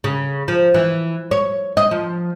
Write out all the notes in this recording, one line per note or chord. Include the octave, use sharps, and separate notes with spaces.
C#3
F3
E3
C#5
D#5
F3